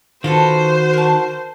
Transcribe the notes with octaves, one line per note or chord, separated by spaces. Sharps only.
D#3 F4 F#4 A4 B4 C5
A#4 A5